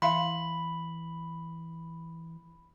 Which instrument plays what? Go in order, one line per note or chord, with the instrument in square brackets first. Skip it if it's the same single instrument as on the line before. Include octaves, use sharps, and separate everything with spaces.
[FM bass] E3 [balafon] E5 F5 C6 [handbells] B5